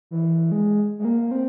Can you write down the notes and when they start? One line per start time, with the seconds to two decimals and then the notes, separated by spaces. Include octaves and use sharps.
0.11 E3
0.52 G#3
0.99 G#3
1.05 A#3
1.31 C4